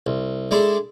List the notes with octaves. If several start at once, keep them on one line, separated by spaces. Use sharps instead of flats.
C2
G#3 D4 E4 A4